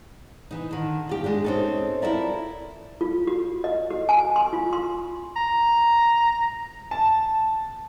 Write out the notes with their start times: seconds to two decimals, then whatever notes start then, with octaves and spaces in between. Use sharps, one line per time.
0.51 E3 D#4
0.71 D3 D#3
1.07 D4 F4 G4
1.24 G#3 D4 G4
1.44 C4 C#4 D#4 G#4 A4
2.02 E4 F4 A4 A#4 D5 E5
3.01 F4
3.27 F#4
3.64 D#5
3.90 F#4
4.09 G#5
4.36 C6
4.53 F4
4.73 C6
5.36 A#5
6.91 A5